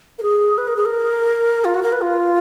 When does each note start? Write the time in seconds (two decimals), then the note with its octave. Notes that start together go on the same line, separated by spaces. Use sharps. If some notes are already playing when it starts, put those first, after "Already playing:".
0.18 A#4
0.23 G#4
0.58 B4
0.67 A#4
0.76 G#4
0.85 A#4
1.65 F4
1.74 F#4
1.83 A#4
1.92 B4
2.01 F4